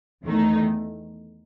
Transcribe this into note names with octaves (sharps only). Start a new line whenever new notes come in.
E2 D#3 A3 D#4